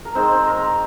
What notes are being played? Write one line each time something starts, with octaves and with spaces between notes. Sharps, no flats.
A#4
D#3 G#3 C4 C5
C5
A#4
A#4